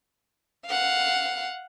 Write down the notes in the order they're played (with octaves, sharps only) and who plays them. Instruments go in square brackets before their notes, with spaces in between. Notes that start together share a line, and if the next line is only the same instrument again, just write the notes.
[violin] F5 F#5